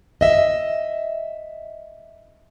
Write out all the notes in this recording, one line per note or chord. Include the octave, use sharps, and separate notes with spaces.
D#5 E5